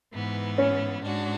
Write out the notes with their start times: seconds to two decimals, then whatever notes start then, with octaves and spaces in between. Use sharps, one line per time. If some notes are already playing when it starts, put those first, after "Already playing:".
0.13 G#2 E3 B3
0.58 C#4
1.03 G#2 G#3 D4 F#4